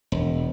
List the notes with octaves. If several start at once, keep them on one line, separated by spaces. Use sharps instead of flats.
E1